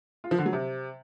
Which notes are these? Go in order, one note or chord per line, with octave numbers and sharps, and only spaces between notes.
F4
F3
D3
F#3
C3